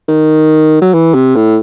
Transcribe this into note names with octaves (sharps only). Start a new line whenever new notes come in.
D#3
F#3
E3
C3
A2